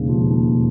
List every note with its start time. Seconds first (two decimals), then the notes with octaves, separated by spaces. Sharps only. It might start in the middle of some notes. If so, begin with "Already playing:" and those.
Already playing: E1 D#2 C#3
0.09 F3
0.27 D#2
0.44 E1